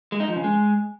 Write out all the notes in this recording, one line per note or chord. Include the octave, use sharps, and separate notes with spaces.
G#3
D#4
F3
C#3
G#3